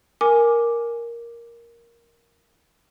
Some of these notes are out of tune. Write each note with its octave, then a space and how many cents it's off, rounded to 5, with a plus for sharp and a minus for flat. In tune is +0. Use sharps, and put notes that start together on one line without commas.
A#4 +5 G#5 +0 D6 +0